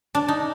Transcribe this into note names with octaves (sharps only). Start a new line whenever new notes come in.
D4
D#4